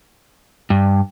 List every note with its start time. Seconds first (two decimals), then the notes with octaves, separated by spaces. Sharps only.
0.70 G2